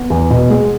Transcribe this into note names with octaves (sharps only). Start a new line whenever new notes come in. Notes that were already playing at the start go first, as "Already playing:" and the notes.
Already playing: B3
E2
B2
G#3